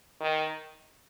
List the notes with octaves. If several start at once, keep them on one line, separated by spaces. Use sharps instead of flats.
D#3